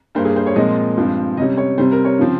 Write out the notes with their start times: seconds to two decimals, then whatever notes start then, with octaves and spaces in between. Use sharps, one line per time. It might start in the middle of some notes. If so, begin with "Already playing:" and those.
0.15 G2 G3 A#3 C5
0.25 G#4
0.36 C5
0.46 C#5
0.55 A#2 F3 G#3 C4 D#5
0.97 G2 F3 G#3 C4
1.37 C3 G3 C#4 D#5
1.58 C#5
1.78 C3 G3 C4 C5
1.92 A#4
2.05 C#5
2.19 C#3 F3 C4